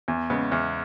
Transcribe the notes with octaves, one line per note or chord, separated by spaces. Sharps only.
E2
C#3 G#3 B3
E2